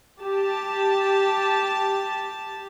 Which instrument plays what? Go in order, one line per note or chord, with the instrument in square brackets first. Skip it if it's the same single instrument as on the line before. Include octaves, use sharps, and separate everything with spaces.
[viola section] G4 A5